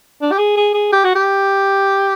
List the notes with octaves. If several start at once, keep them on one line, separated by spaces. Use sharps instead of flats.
D4
G4
G#4
G#4
G#4
G4
F#4
G4